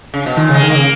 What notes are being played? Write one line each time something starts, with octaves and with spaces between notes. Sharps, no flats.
C#3
B2
A#2 D#3
C#3 G#3
D#3
C#3 A#3